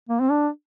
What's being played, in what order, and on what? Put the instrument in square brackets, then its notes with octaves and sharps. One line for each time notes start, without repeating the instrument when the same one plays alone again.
[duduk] A#3
C4
D4